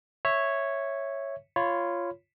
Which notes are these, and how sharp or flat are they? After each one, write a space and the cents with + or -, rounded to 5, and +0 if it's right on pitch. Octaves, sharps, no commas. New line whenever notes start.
C#5 -5 E5 +0
F4 -10 C#5 +0 B5 +10